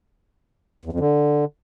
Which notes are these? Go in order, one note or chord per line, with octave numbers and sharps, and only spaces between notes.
E2
F2
D3